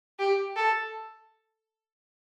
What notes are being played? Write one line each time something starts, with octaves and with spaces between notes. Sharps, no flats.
G4
A4